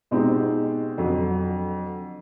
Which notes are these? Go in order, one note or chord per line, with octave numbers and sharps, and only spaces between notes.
B2 G#3 C4 D#4 G4
F2 D3 F#3